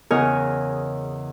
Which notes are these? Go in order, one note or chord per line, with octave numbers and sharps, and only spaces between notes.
E2 C#3 A#4 C#5 D#5 G#5